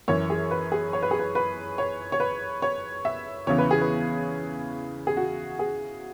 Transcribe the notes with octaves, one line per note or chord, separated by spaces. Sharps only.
F#2 E3 C#5
G#4
B4
G#4
C#5
B4
G#4
B4
B4
C#5
C#5
B4
C#5
E5
E2 C#3 E3 C#5
B4
G#4
B4
G#4
F#4
G#4